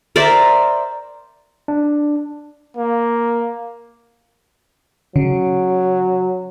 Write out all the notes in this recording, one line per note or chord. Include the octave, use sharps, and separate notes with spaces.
A#4 C5 D5 E5
D4
A#3
C#3 F#3